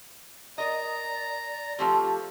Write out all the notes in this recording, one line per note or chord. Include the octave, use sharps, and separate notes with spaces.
A#4 D5 D#5 A#5
F3 A3 C4 G4